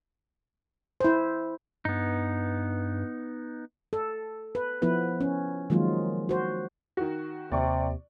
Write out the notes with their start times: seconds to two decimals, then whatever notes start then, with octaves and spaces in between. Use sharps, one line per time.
1.00 E4 C5
1.85 G2 B3 D#4
3.93 A4
4.55 B4
4.82 F3 B3 E4 B4
5.21 C#4
5.70 D#3 F3 F#3 G#3 A#3 F4
6.29 F#4 C5
6.97 D#3 F#4
7.52 D#2 C3 D5 C#6